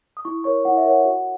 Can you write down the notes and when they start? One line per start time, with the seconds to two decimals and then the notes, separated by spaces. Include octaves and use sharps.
0.17 D#6
0.25 E4 C#6
0.44 A#4 C#5 C#6
0.65 E4 F#5
0.77 E5
0.85 A#4 C#5 F#5
1.05 F#4